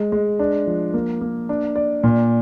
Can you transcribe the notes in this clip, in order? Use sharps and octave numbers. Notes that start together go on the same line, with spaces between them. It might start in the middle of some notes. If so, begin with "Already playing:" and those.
Already playing: G#3
G#3
D4
F3
A#3
A#3
D4
D5
A#2